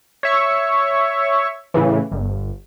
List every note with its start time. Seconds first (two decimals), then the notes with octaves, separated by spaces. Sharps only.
0.23 C#5 E5 C#6
1.74 A2 C#3 E3
2.12 G1